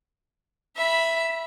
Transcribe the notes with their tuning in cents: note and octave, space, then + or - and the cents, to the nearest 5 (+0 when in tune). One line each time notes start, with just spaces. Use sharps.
E5 +5 B5 -15